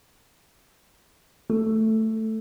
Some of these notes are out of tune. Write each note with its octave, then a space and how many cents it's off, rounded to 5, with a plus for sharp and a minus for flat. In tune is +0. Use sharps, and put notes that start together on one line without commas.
A3 +5